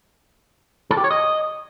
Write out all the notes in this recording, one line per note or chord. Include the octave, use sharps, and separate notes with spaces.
A4
G4
C#5
D#5